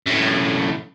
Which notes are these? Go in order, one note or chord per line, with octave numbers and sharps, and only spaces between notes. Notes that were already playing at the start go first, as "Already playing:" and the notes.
F#2 A2